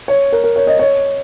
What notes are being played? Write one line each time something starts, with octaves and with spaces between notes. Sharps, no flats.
C#5
A#4
A#4
C#5
D#5
C#5